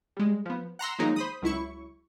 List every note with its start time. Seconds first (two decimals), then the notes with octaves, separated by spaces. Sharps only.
0.17 G3 G#3
0.46 F3 B3
0.79 F#5 A#5 C6 E6
0.99 D#3 F3 F#3 G#3 A#3 D#4
1.16 C5 B5 D#6
1.42 C#2 F#3 E4 C#6